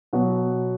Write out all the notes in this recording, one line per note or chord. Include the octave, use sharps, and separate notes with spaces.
B2 F#3 B3 F#4